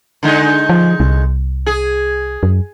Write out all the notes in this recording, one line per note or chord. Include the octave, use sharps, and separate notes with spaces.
D3 G#3 D#4
F3
C2
G#4
F#2